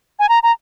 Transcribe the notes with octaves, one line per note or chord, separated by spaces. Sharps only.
G#5
A#5
A#5